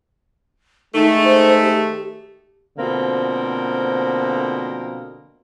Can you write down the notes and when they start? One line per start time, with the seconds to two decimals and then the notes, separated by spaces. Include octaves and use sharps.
0.94 D#3 G#3 A3 D#4
1.24 C5
1.62 G4
2.78 B2 D3 F3 A#3 C4